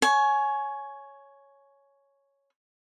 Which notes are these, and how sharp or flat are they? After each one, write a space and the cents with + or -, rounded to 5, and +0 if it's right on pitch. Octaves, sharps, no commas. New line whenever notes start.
C#5 +0 G#5 +20